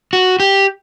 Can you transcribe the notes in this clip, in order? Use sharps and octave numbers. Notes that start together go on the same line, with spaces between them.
F#4
G4